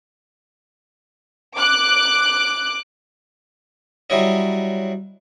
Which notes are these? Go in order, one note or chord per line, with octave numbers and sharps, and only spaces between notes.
D6 F#6
F#3 G3 E4 C#5 D#5